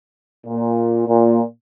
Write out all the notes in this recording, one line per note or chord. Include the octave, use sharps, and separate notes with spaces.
A#2
A#2